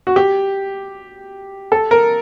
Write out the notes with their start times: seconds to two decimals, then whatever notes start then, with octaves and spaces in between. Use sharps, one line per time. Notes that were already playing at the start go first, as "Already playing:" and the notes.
0.07 F#4
0.16 G4
1.72 A4
1.91 A#4